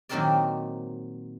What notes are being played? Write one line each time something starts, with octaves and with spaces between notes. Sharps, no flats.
A#2 D#3 F#3 C4 A#4 D5